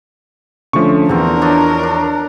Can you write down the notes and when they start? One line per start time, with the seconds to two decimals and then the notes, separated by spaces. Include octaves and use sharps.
0.73 D3 F3 A3 C#4 C#6
1.09 E2 D3 C4 A#4
1.41 D4 C#5 D#5
1.83 D4